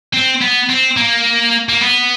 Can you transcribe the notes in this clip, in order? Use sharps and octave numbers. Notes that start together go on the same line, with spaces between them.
C4
B3
C4
A#3
A#3
B3